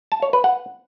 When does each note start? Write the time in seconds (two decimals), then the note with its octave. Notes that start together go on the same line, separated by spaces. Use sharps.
0.12 A5
0.22 C#5
0.33 B4
0.44 F#5